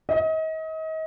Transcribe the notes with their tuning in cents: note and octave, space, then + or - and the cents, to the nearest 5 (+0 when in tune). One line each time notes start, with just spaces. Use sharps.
D#5 +35